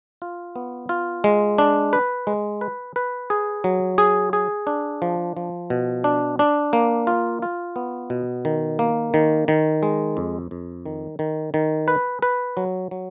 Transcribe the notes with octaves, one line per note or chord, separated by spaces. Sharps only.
F4
B3
F4
G#3
D4
B4
G#3
B4
B4
G#4
F#3
G#4
G#4
D4
F3
F3
B2
D4
D4
A#3
F4
F4
B3
B2
D#3
A#3
D#3
D#3
G#3
F2
F2
D#3
D#3
D#3
B4
B4
F#3
F#3